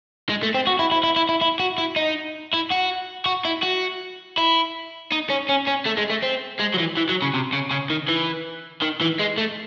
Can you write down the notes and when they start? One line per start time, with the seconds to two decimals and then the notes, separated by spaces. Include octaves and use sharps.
0.29 G#3
0.43 A3
0.54 C4
0.67 F#4
0.79 E4
0.92 E4
1.03 E4
1.16 E4
1.29 E4
1.42 E4
1.60 F#4
1.78 E4
1.96 D#4
2.53 E4
2.71 F#4
3.26 F#4
3.45 E4
3.63 F#4
4.38 E4
5.12 D#4
5.30 C#4
5.49 C#4
5.68 C#4
5.86 A3
5.98 G#3
6.10 A3
6.23 C4
6.60 G#3
6.74 F#3
6.79 E3
6.97 E3
7.09 F#3
7.22 C#3
7.34 C3
7.53 C#3
7.71 C#3
7.90 D#3
8.08 E3
8.82 D#3
9.01 E3
9.19 G#3
9.38 A3